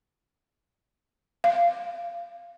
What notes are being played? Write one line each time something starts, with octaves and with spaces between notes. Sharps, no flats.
F5